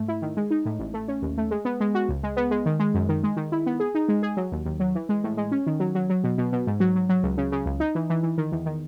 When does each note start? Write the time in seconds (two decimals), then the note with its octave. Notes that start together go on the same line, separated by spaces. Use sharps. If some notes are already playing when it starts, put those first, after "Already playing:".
Already playing: G#2 A3
0.08 E4
0.22 D#3
0.37 G#3
0.51 D#4
0.65 A2
0.79 A1
0.94 A3
1.08 C#4
1.22 D#2
1.38 A3
1.51 G#3
1.65 B3
1.80 G#3
1.95 F#4
2.09 C#2
2.23 G#3
2.37 B3
2.51 G#3
2.66 D#3
2.79 G#3
2.94 F#2
3.09 D#3
3.23 G#3
3.37 D#3
3.52 E4
3.66 B3
3.80 G#4
3.95 D#4
4.08 G#3
4.23 G#4
4.37 F#3
4.52 D#2
4.65 D#2
4.80 F#3
4.95 E3
5.09 G#3
5.24 A2
5.37 G#3
5.52 C#4
5.66 D#3
5.80 F#3
5.95 F#3
6.10 F#3
6.24 B2
6.38 B2
6.52 B2
6.67 G#2
6.80 F#3
6.95 F#3
7.09 F#3
7.23 C#2
7.37 C#3
7.52 C#3
7.66 C#2
7.80 D#4
7.95 E3
8.10 E3
8.23 E3
8.38 D#3
8.52 E2
8.66 D#3